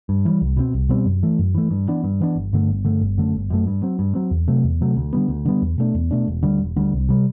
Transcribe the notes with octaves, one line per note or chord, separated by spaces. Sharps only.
G2
E3 G3
C2
B2 G3 C4
C2
B2 G3 C4
F#2
E3 A3
F#2
E3 A3
G2
E3 B3 D4
G2
E3 B3 D4
G1
G2 D3 A3
G1
G2 D3 A3
G1
F#2 D3 A3
G1
F#2 D3 A3
G2
F#3 C4
G2
F#3 C4
E2
C3 F#3 A3
E2
C3 F#3 A3
D2
D3 G3 B3
D2
D3 G3 B3
E2
B2 A3 D4
E2
B2 A3 D4
E1
D2 D3 G3
E1
D2 D3 G3
C2
C3 G3